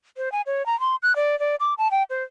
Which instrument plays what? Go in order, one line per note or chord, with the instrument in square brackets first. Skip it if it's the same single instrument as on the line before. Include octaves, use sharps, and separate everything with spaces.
[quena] C5
G#5
C#5
A#5
C6
F#6
D5
D5
D6
A5
G5
C5